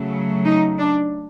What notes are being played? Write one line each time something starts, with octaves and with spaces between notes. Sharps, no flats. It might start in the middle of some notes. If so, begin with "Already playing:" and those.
Already playing: C#3 F#3 A3
D#4
D4